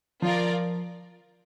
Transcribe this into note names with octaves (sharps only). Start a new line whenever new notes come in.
F3 F4 A#4 D5